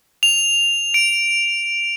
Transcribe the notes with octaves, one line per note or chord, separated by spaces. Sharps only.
F7
D7